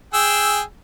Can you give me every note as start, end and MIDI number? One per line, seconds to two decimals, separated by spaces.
0.14 0.61 68
0.14 0.61 79
0.14 0.61 88